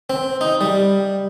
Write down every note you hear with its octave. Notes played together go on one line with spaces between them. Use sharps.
C4
D#4
G3